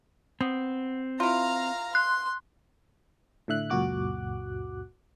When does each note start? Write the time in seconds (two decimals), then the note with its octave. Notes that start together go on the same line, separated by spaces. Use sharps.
0.41 B3 C4
1.20 E4 F4 F5 A#5
1.95 C6 F#6
3.48 A2 D3 E5 F#6
3.70 C#2 F#2 A#2 F#4 D6 F#6